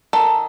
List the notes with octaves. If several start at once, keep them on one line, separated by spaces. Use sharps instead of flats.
D#3 A4